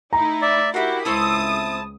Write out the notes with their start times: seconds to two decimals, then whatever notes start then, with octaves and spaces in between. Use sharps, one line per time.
0.13 A3 D#4 E4 A#5
0.42 D5 E5
0.74 A#3 E4 F#4 G4
1.05 C#2 A3 C4 E4 A5 D#6